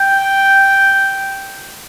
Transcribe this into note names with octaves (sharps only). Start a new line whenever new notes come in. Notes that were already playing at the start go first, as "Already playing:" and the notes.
Already playing: G5